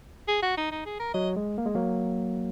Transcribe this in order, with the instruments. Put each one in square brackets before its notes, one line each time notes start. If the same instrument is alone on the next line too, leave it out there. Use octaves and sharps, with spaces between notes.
[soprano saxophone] G#4
F#4
D#4
D#4
G#4
A#4
[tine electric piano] F#3 [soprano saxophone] D#5
[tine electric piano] G#3
A#3
G#3
F#3 A#3